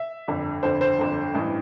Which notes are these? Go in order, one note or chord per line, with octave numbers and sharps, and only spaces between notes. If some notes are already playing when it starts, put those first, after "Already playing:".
Already playing: E5
G1 F2 D3
G1 F2 D3 C5
C5
G1 F2 D3
A1 G2 E3